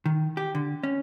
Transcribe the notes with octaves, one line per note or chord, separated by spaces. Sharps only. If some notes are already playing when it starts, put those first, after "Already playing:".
D#3
G4
D3
C#4